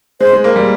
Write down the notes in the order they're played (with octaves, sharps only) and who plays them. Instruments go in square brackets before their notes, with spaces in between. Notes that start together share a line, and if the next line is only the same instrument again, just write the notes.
[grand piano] G#3 [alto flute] C5
[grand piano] G#3
A#3
G3